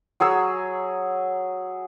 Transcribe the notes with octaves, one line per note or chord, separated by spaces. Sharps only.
F#3 G#4 C#5 E6